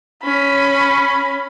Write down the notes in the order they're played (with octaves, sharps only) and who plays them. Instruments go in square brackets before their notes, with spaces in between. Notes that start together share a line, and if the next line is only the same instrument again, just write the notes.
[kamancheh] C#4 B5